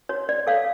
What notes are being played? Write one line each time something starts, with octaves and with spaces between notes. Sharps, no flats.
F#4 C#5
D5
A4 C#5 F5